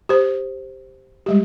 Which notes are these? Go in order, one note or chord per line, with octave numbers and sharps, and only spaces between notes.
G4 C5
G3 G#3 G4